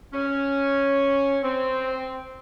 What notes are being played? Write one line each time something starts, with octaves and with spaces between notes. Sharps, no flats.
C#4
C4